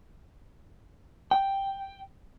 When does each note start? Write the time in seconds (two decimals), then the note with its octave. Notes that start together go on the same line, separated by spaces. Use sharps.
1.31 G5